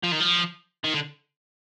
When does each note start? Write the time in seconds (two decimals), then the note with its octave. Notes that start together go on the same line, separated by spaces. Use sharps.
0.04 F3
0.12 D#3
0.20 F3
0.84 D#3
0.94 D3